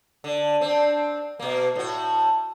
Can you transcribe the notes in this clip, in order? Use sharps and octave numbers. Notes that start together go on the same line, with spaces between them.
D3
C4 D4
B2 A#3
A2 F#4